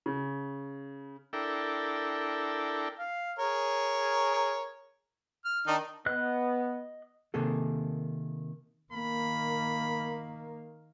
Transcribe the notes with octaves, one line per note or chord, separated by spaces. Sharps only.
C#3
D4 E4 A4 A#4 G5
F5
G#4 A#4 C#5
F6
D#3 D4 D#4
B3 D#5 F#6
C3 D#3 A#3 G#4 A4
D#3 A#3 B5